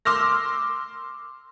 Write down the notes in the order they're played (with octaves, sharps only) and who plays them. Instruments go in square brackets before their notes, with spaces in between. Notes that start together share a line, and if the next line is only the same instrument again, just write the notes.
[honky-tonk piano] C6 D6 E6 F6 A#6